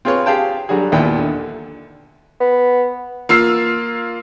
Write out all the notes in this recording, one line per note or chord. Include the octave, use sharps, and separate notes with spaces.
C4 F4 G#4 B4 C#5 C6
G4 G#4 F5 G5 A5
D3 F#3 G3 F#4 G#4
G#1 D#2 A#2 B3 E4 G5
D3
B3
A#3 F4 E6 C7